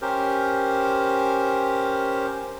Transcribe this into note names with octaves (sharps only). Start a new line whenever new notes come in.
C#4 G4 A#4 C5